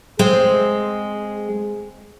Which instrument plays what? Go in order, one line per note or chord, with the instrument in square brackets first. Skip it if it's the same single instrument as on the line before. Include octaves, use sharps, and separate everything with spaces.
[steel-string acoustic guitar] G#3 [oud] C4 [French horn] G#4